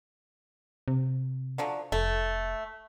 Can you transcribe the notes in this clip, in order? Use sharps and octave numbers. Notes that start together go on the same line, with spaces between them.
C3
D3 F3 F#3
F1 A3